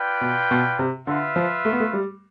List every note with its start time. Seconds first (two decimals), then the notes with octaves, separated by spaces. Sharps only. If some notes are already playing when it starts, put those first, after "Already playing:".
Already playing: F4 B4 D5 G5
0.21 B2
0.51 B2
0.79 C3
1.07 D3 F4 B4 E5
1.36 F3
1.65 A3
1.73 B3
1.80 A3
1.93 G3